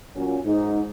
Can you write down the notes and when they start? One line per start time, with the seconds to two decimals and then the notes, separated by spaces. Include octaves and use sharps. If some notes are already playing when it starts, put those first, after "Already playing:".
0.16 A#2 F#3 C#4
0.45 G#2 D#4